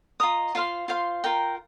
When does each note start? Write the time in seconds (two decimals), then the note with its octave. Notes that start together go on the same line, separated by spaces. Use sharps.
0.20 F4 D#5 A#5 D#6
0.55 F4 C5 F5 C6
0.88 F4 C5 F5 C6
1.24 F4 A#4 G5 A#5